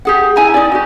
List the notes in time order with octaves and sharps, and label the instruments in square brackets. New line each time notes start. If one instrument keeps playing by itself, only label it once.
[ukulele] G4 G#4 F#5
E4 G#5 A#5
D#4 D5
F#4 G4